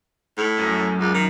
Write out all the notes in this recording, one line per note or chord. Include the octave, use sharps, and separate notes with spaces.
A2
F#2
C#2
D#3